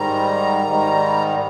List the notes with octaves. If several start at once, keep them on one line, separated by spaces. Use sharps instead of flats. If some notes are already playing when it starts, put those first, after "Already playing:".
Already playing: G#2 D#3 G3 A#5
G#2 D#3 G3